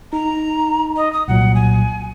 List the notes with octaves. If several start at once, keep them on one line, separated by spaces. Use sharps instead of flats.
D#4 A#5
D#5
D#6
C2 A#2 F#3 F#5
G#5